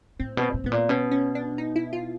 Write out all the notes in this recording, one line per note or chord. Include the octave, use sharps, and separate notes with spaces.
A2 C4
B2
C4
A#2
A2 B3
A#2
B2 C#4
C#4
D4
D#4
E4
F4